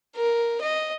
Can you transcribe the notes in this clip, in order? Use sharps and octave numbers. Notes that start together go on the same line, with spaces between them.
A#4
D#5